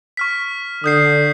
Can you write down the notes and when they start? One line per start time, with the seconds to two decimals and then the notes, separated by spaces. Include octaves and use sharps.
0.17 C#6 F6 B6
0.84 D3 D#6 G6 C7